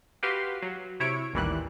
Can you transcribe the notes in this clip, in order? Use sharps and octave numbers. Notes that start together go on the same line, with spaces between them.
F#4 G4 B4 F5 C6
F#3
C3 E4 C#5 D7
A1 D#2 A#2 E3 G3 F#6